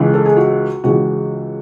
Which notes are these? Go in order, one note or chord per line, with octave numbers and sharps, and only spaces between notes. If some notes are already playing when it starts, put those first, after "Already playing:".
Already playing: C#2 C#3 E3
A4
G#4
F#4
C#2 C#3 E3 F#4